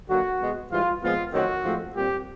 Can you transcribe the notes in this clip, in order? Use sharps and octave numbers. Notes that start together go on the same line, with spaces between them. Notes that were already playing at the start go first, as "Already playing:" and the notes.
D3 F#3 A#3 F#4
B2 G#3 B3
G#2 E3 G3 F4
A#2 F3 G#3 B3 F4
F#2 D#3 F#3 A3 C4 F#4
G#2 F3 A3 C4
A#2 G3 C4 G4